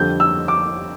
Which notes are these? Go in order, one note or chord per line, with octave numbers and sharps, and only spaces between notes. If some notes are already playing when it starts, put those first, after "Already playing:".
Already playing: F2 D3 G3 G6
E6
D6